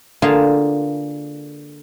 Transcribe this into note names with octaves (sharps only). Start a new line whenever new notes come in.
D3 A#3 F4 G#4 F5 A5